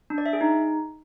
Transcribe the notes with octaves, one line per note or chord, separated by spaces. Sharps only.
D4
D5
E5
G#4
D#4